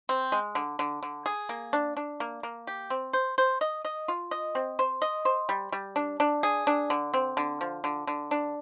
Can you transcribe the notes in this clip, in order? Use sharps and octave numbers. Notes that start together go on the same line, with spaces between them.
C4
G#3
D3
D3
D3
G#4
A#3
D4
D4
A#3
A#3
G4
C4
C5
C5
D#5
D#5
F4
D#5
C4
C5
D#5
C5
G3
G3
D4
D4
G#4
D4
D3
C4
D3
F3
D3
D3
D4